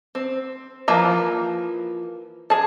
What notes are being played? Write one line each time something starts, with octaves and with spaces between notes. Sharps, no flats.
C4
E3 F3 A#3 A#5
G#4 A5